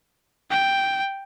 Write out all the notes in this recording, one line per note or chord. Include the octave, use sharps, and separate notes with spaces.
G5